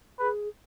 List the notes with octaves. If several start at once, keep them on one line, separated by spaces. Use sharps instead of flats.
G#4 B4